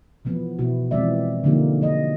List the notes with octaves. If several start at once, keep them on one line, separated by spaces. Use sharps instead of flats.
E3 F3 B3
B2 B3 E4 F#4
E3 F3 G#3 C4 D5 E5
D3 F3 A#3 D#4 G4
F#3 D4 D#5